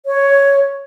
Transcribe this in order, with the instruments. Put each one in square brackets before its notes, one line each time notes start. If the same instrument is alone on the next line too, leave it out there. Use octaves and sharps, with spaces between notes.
[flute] C#5